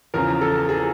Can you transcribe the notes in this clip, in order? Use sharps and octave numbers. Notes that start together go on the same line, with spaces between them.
E2 C#3 F3 A#4
A4
G#4